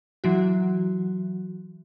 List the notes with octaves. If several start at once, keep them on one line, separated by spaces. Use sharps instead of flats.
E3 F#3 F#4